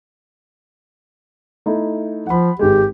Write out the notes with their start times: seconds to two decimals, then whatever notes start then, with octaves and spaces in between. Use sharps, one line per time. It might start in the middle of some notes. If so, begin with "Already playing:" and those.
1.66 A3 D#4 E4
2.27 F3 F#5 B5
2.59 G#1 G#3 G4